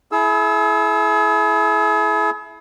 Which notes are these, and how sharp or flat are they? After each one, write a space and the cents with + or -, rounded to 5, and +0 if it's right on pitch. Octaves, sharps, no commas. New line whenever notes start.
E4 +0 G#4 +40 E6 +0